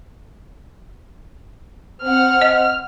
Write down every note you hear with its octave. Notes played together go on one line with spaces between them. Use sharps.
C4 F#5 F6
D#5